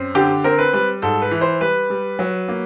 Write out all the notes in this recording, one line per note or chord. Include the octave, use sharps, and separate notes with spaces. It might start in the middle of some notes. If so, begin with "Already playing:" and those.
Already playing: F#2 C4
D3 G4
C4 A#4
B4
G3 B4
G#2 A4
B4
E3
C5
G3 B4
G3
F#3
A#3